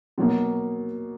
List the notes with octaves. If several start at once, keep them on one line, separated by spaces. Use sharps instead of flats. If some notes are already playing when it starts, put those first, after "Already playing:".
B2 F#3 A#3